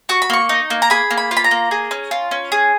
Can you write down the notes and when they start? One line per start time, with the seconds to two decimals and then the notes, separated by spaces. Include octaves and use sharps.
0.09 F#4 C#6
0.22 B5
0.30 A#3 C#6
0.49 D#4
0.70 A#3
0.82 A#5
0.90 G#4 B5
1.11 A#3
1.17 B5
1.31 F4
1.37 B5
1.44 A#5
1.51 A#3
1.71 G#4
1.91 C#4
2.11 F4
2.31 C#4
2.52 G#4